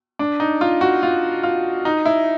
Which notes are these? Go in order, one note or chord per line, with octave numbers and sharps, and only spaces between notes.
D4
D#4
F4
F#4
F4
F4
D#4
E4